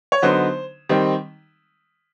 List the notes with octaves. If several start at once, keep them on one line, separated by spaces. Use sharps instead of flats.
C#5
D3 F#3 B3 D#4 C5
D#3 G3 C4 D#4